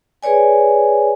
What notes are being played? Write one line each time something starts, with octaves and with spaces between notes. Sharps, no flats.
G#4 B4 C#5 D5 G#5